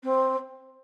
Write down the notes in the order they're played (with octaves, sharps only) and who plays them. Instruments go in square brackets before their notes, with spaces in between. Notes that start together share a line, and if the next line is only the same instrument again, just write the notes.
[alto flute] C4